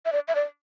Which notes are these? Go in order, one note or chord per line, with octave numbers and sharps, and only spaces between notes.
E5
D5
E5
D5